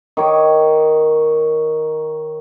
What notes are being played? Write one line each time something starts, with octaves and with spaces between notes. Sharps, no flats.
D#3 C#5 D6